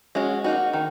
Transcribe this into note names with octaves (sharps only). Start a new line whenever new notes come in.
G#3 C#4 F#4
A#3 D#4 F#4
D#3